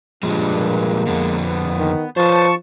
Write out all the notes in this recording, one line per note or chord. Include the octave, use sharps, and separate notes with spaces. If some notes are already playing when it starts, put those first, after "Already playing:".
G2 A#2 F3 G#3
A#3
F2 D3 G#3 B3
B3
D#3
F3 B4 C5 A5 C#6